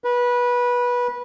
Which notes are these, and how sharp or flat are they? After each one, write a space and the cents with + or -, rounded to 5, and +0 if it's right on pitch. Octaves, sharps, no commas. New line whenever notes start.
B4 -20